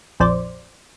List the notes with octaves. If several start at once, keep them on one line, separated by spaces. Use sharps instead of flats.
A#1 F2 C5 D5